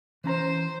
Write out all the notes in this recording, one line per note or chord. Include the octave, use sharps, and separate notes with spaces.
E3 C#4 C5 A#5